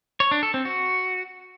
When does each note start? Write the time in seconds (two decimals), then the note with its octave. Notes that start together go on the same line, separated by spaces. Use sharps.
0.20 C#5
0.31 D4
0.43 A4
0.54 C4
0.65 F#4